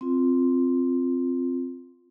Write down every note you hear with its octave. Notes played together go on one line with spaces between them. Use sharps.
C4 F4